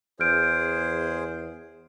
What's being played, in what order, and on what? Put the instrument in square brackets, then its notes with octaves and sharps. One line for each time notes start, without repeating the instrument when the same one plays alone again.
[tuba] E2 [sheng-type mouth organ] G#4 C5 [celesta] F6 G6 D7